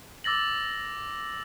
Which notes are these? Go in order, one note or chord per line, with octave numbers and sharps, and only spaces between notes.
D6 E6 A6 A#6 F#7